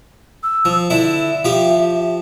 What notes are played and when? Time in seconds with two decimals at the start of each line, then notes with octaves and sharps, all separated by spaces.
0.43 E6
0.65 F3
0.90 D3 E4 E5
1.44 F3 G4